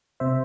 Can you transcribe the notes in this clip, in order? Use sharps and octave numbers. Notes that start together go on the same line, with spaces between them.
C3 C5 E5